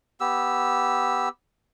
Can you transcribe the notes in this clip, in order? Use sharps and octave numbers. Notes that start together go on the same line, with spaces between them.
B3 G4 E6